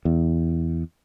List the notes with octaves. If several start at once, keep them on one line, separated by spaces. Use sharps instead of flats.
E2